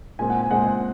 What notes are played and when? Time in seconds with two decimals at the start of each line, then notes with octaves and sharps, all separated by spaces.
0.19 A#2 G#3 C4 G#5
0.30 F#5
0.40 G#5
0.50 A#2 G#3 C4 F#5
0.66 F#5